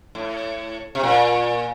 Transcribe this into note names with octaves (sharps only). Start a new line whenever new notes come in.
A2
C3
A#2